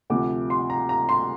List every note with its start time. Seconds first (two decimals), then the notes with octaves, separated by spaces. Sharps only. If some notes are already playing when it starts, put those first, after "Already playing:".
0.10 D2 C3 F3 D6
0.50 C6
0.70 A#5
0.89 A#5
1.09 C6